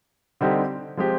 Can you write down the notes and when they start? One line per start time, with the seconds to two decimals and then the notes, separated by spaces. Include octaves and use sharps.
0.41 D3 G3 C4 D#4 G4
0.97 F3 G#3 C4 G4